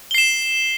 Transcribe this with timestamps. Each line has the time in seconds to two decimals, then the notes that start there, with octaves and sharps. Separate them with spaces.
0.11 G7
0.15 C7
0.18 E7